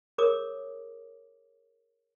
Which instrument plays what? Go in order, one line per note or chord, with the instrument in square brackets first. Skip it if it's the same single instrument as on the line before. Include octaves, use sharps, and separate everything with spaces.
[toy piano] G#4 A#4 C#5 D6 D#6